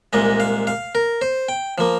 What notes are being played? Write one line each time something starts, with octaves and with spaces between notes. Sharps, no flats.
C2 A#2 G#3 D#5
F5
F5
A#4
C5
G5
F3 A#3